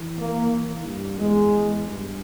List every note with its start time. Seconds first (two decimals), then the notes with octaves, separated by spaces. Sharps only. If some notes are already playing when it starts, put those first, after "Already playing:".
Already playing: E3
0.17 A#3
0.52 E3
0.86 G2
1.20 E2 G#3
1.54 E2
1.88 G2